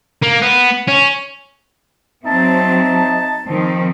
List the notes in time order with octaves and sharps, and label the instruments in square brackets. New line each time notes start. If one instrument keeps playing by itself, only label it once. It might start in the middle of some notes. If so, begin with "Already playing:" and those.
[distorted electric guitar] A#3
B3
C#4
[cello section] F#3 C4 [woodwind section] D#4 E5 A5
[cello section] D#3 F3 C4